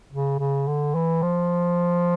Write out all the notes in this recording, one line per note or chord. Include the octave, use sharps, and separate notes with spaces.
C#3
C#3
D3
E3
F3